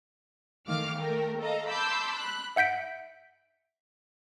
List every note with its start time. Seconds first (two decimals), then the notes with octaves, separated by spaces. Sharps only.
0.68 D#3 A3 F5 D6 F6
0.96 A3 A#4 G5
1.39 A4 D#5 F5 A#5
1.69 A5 B5 C6 D6 E6 G6
2.16 B5 F#6
2.56 E5 F#5 G6 B6 D7